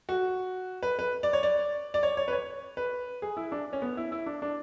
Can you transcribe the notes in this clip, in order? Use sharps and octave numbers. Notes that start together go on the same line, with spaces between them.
F#4
B4
B4
D5
C#5
D5
D5
C#5
C#5
B4
C#5
B4
G#4
E4
D4
C#4
B3
E4
E4
D4
D4